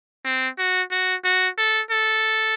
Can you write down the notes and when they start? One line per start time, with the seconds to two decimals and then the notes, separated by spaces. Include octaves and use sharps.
0.25 C4
0.59 F#4
0.91 F#4
1.25 F#4
1.58 A4
1.91 A4